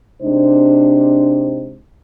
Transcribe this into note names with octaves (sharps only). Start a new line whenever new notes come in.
C3 G#3 D4 D#4 C5